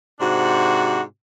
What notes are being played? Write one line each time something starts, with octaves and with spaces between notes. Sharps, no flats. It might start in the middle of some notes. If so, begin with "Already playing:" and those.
G#2 C3 D4 F#4